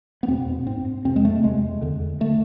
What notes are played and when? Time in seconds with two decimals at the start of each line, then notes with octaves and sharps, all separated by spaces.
0.23 B3
0.28 E2 B2 C4
0.67 G#2 C4
1.05 F2 C3 C4
1.16 G#3
1.25 A3
1.43 E2 C3 G#3
1.81 E2 D3
2.20 D3 A3